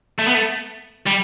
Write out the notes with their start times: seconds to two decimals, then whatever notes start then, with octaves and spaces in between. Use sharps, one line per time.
0.19 A3
0.28 B3
0.35 A3
1.07 G3